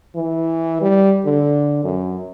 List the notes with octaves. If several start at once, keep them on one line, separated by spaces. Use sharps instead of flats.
E3
G3
D3
F#2